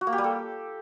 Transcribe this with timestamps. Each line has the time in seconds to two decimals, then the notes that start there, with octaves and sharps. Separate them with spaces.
0.01 F#4
0.07 A#3
0.13 G4
0.18 G3
0.24 A4